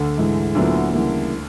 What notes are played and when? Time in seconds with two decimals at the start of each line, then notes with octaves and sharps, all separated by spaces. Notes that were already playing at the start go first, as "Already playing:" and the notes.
Already playing: D2 D3
0.18 G#2 E3 G#3
0.55 D2 A#2 D3 F#3 B3 E4
0.94 C#3 E3 G3 A#3